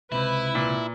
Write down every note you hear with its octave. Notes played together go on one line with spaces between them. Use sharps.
C#2 C3 E4 B4
A#2